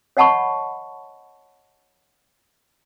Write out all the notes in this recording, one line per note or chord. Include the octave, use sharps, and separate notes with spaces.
C#5 D#5 F#5 A5 B5 C#6